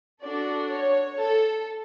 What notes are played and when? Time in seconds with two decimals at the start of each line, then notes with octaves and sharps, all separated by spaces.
0.24 D4 F#4 A4 D5
0.72 C#5
1.20 A4